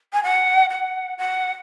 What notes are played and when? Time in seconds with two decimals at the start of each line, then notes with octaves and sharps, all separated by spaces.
0.13 G#5
0.23 F#5
0.70 F#5
1.18 F#5